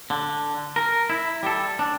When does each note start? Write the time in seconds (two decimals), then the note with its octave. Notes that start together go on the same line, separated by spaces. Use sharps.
0.10 D3
0.76 A#4
1.10 E4
1.43 G3 A4
1.79 D4